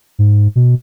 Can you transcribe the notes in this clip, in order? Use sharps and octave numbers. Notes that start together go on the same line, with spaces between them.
G#2
B2